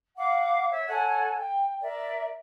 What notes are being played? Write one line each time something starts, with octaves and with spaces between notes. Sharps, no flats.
F5 F#5 D6
C#5 E5
A4 C#5 F#5 G#5
G5
A#4 D5 E5